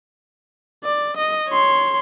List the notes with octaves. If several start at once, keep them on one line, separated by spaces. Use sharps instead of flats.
D5
D#5
C#5 C6